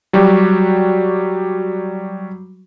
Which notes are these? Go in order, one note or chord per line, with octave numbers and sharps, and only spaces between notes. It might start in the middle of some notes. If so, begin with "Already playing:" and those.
F#3 G3 F#4 G4